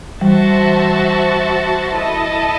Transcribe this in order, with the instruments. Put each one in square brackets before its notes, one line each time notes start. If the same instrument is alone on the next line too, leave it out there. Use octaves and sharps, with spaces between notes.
[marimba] E3 G3 [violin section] F#4 C5 E5 A5
[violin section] E4 A4 D#5 A5